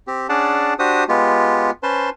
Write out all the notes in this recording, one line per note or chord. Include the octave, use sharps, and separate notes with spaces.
C4 G4
C#4 D4 G#4 D5 F#5 A5
D4 F#4 G4 C5 D#6
G#3 B3 F4 G4
C#4 B4 C5 A5 C6